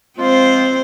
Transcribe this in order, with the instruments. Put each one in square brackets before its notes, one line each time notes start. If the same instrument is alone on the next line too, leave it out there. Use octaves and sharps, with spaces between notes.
[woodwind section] F3 G#3 F4 [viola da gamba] C4 C5